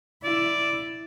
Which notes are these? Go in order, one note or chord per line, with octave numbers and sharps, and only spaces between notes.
E4 D5